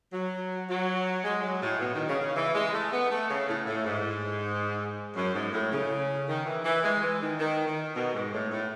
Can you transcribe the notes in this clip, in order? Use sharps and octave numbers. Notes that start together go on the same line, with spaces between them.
F#3
F#3
G#3
F#3
A2
B2
D#3
C#3
C#3
E3
G#3
A3
B3
A3
C#3
A2
A2
G#2
F#2
G#2
A2
C#3
D#3
E3
E3
G#3
E3
D#3
D#3
D#3
B2
G#2
A2
A2